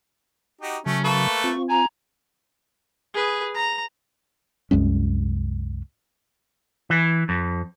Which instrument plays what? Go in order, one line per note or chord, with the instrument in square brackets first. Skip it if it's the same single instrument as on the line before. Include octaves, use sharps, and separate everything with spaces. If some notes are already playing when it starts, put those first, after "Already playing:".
[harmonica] D#4 F#4 G4
[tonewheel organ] C#3 F#3 [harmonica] A3 [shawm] C#4
[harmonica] A3 A#3 B4 [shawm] A4 [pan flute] C#6
[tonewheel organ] C4 F4
[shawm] G#5 [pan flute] A#5
[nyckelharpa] G#4 B4
A#5
[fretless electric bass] C2 F#2 G#3 C#4
[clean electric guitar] E3
F2